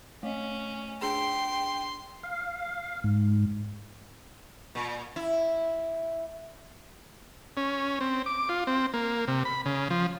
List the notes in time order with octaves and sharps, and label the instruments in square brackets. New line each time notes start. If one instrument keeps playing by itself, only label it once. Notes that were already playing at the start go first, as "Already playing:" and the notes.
[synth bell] A3 D#5 [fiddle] C#4
[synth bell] D4 G#4 [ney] G5 [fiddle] C6
[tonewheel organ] F5
G#2
[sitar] A#2
E4
[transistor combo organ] C#4
C4
D6
F4
C4
A#3
C3
B5
C#3
F3